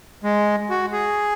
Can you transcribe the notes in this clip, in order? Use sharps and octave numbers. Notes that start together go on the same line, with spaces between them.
G#3
F#4
G#4